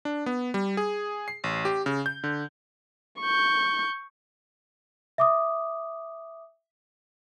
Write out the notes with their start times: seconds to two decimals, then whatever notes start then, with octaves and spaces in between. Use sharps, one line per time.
0.05 D4
0.26 B3
0.54 G3
0.77 G#4
1.28 C7
1.44 A1
1.65 G4
1.86 C#3
2.06 G6
2.24 D3
3.21 C#6 G6
5.18 E5 D6 D#6